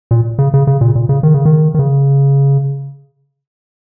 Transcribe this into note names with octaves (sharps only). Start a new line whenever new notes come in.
A#2
C#3
C#3
C#3
A#2
A#2
C#3
D#3
C#3
D#3
D#3
C#3